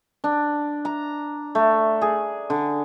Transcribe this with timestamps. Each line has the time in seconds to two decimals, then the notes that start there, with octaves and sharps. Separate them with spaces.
0.24 D4
0.85 A#5
1.55 A3
2.01 G#4
2.50 D3